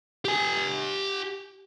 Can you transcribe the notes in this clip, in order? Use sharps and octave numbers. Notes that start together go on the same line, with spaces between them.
G4 G#5